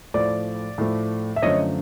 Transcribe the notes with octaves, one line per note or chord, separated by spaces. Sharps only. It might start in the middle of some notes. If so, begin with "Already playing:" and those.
A2 F3 A3 D5
A2 F3 A3
E5
F#2 D3 F3 A3 C#5 D#5